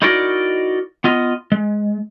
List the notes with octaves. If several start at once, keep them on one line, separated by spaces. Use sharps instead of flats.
D#4 E4 F#4 A#4 D5 D#5
B3 F4 D#5
G#3